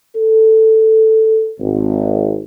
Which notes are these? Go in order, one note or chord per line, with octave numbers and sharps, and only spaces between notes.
A4
G#1